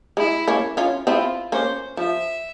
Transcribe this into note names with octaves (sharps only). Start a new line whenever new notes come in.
G#3 E4
A#3 C#4
C#4 F4
C4 E4 F4
A#3 C#4 C5
F3 E5